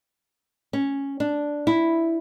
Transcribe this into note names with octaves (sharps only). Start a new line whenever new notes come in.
C#4
D4
E4